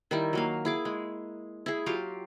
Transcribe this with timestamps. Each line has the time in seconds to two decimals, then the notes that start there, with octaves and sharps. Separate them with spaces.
0.11 D#3 G3 E4
0.33 F#3 A#3 F5
0.65 E4 G#4 D6
0.85 G#3
1.66 E4 G#4
1.86 F#3 F4 G4 F5